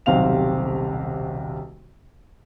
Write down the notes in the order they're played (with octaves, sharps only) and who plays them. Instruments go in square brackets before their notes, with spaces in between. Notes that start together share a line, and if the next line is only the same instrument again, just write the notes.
[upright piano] D#1 B1 C3 C4 F5 F7